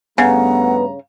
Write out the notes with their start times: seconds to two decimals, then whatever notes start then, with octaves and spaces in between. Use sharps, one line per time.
0.18 G2 C#3 A3 B3 F#5 A#5